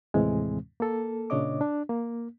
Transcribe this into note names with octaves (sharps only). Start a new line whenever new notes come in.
D#2 A2 C3 E3 G#3 C4
A#3 A4
A#2 C#3 D4 C#5 D#5 D6
D4
A#3